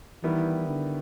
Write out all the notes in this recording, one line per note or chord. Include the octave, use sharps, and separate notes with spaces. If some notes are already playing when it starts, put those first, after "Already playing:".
D#3 E3 G3 B3 E4 G4
D3